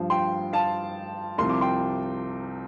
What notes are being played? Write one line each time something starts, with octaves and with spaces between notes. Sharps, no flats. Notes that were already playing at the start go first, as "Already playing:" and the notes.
Already playing: G2 F3
G5 C6
F5 A5
C2 C3 F3 C6
D6
G5 C6